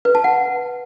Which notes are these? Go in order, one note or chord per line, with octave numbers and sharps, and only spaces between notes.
B4
A5
F#5